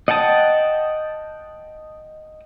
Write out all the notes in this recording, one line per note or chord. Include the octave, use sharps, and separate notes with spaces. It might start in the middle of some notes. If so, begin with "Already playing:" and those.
D#5 F#5 G5 A5 D#6